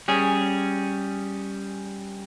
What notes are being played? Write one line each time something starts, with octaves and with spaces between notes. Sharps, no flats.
G3 C#4 G#4